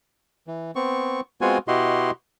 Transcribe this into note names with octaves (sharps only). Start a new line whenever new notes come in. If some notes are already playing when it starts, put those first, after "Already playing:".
E3
B3 C4 C#6
G#3 B3 C4 F4 F#4 G#5
B2 E4 F#4 G4 D#5 C6